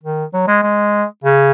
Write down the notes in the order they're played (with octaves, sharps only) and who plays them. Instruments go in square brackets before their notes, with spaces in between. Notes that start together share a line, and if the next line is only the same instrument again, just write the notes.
[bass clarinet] D#3
F#3
G#3
G#3
C#3